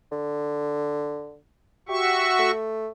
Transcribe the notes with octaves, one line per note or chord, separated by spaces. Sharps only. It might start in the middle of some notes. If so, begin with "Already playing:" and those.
D3
F#4 G4 E5 C#6
A3